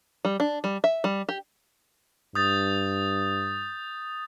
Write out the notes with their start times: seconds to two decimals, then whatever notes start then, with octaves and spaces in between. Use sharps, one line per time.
0.25 G3
0.40 D4
0.64 G3
0.84 E5
1.04 G3
1.29 G4
2.35 G2 D#6 G6 A6